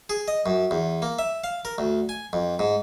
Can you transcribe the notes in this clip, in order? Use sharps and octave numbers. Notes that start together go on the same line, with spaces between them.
G#4
D#5
F#2
E2
A#3
E5
F5
A#4
D2
G#5
F2
G#2